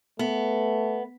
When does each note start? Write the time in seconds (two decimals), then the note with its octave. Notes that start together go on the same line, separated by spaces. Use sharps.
0.19 A3 B3